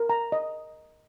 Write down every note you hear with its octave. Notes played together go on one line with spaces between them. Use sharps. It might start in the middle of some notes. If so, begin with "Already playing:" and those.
Already playing: A#4
A#5
D#5